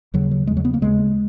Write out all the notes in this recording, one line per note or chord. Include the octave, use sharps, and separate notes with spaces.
D#2 C#3 F#3
F#3
E2 C#3 G#3
F#3
B3
A#3
D#2 C#3 G#3